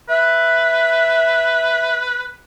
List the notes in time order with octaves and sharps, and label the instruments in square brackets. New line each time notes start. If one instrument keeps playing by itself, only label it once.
[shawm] B4 [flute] E5